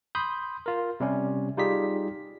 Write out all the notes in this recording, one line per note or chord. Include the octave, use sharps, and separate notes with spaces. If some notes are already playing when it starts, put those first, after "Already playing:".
B5 C6 D#6 G6
F4 A#4
C3 G3 C#4
G3 D#4 F4 G4 G#4 B6